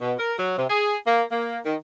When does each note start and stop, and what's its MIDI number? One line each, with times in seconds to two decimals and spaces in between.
0.01 0.14 47
0.19 0.33 70
0.38 0.55 54
0.58 0.66 48
0.70 0.96 68
1.07 1.23 58
1.31 1.59 58
1.65 1.75 51